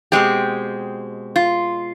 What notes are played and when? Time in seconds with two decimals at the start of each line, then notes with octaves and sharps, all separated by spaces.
0.12 B2 G#3 C4 G4
1.36 F4